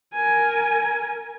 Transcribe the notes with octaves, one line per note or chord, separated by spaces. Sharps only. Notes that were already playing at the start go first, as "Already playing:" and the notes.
A#4 G#5